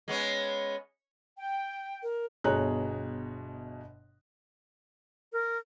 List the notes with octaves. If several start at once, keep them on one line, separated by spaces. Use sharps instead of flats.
G#3 B3 C#4
G5
A#4
G1 B2 G#4 C#5 A#5 F#6
A#4